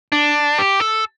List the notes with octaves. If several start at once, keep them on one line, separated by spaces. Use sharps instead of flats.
D4
G4
A4